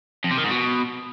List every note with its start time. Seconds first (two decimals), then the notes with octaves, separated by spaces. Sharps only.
0.24 F2
0.31 C3
0.37 D#3
0.44 G#2
0.50 B2